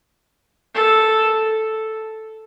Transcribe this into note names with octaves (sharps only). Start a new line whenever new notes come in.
A4